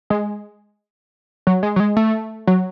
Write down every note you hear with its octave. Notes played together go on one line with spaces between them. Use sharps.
G#3
F#3
G#3
F#3
G#3
A3
F#3